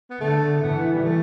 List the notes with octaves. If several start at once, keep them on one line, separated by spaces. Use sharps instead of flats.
B3
D3 A3
E3 B3
G3
A3